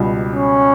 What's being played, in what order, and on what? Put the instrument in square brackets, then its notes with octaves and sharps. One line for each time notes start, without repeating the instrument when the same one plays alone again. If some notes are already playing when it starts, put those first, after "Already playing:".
Already playing: [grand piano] C#2 B2 G3
[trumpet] C#4